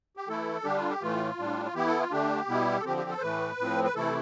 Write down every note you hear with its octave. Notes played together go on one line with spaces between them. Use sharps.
G4
E3 A3 E4 A4
D3 G3 D4 G4
F4
G4
A2 E3 A3 F4
A2 G3 D4
F4
E3 B3 E4 G4
A4
F4
D3 A3 D4 G4
B2 G3 B3 E4
A4
D3 F3 C4 G4
G4
A4
C5
A2 E3 A3 B4
A2 F3 C4
B4
C3 E3 A3 E4 A4